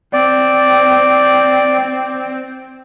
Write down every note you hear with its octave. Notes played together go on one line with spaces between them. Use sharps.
C4 D5